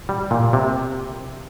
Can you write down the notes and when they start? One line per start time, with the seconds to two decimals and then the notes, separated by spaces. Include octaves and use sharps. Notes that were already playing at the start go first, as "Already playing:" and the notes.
0.09 G3
0.31 A#2
0.53 C3